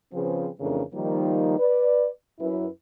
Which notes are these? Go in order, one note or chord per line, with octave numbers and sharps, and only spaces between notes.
C#3 F3 C4 G#4 B4
F2 C#3 E3 A3 D4 A#4
D#3 F3 G3 A#3 D#4
B4 D5
F#2 E4 B4